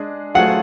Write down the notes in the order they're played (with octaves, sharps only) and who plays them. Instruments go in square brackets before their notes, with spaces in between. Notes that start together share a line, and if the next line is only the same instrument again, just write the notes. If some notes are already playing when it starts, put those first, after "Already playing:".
Already playing: [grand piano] G#3 D4 G#4
[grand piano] F#3 A3 F4 G#4 [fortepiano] F#5